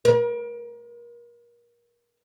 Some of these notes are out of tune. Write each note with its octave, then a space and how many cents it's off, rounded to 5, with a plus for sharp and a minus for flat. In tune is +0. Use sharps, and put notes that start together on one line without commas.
A#4 +30